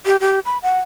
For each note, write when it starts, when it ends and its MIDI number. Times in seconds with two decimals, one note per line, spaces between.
0.06 0.16 67
0.21 0.40 67
0.45 0.58 83
0.63 0.79 78